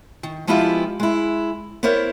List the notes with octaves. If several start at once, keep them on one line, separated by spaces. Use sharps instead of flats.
D#3
F3 G#3 B3 E4 F4 G4
G#3 E4
B3 E4 A#4 C5 C#5